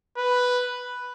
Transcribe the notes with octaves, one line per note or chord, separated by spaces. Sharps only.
B4